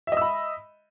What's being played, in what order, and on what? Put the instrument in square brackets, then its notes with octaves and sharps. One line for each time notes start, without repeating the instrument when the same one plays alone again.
[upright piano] E5
D#5
E6
B5